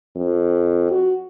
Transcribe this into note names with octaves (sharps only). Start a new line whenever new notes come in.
F2
F#4